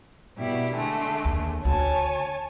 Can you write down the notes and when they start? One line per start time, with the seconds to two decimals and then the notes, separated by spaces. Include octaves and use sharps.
0.38 B2 G3 E4
0.76 D3 G#3 A3
1.25 D#2
1.65 D2 C#5 G#5 A5